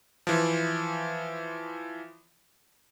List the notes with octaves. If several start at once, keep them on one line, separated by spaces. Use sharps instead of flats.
E3 F3